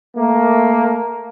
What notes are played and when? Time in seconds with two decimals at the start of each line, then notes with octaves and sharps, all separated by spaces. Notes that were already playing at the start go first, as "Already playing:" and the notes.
0.16 A3 A#3